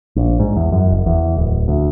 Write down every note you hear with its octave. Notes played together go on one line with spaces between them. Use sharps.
A#1
G#2
E2
F#2
F#1
E2
D1
D2